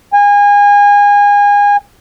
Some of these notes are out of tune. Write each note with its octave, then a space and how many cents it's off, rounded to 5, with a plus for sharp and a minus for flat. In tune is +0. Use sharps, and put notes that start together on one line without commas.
G#5 -30